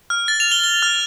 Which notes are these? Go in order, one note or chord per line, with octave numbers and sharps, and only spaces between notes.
F6
A6
F7
G7
G7
F6